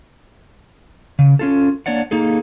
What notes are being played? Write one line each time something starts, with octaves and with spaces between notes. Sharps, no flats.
C#3
C#4 F4 A4
A#3 D4 C#5 D5 F#5
A#3 D#4 G#4 A4